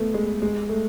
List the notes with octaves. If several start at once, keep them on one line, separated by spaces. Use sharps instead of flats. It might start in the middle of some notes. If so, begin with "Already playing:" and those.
Already playing: A3 B3
G#3
G#3
A3